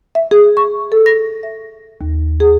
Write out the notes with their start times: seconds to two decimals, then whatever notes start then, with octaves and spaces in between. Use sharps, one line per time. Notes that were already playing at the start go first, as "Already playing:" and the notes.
0.15 E5
0.31 G#4
0.57 C#6
0.92 A4
1.06 A#6
1.43 E5
2.01 D#2
2.40 G#4